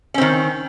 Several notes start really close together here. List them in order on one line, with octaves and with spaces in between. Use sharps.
C#4 C4 D#3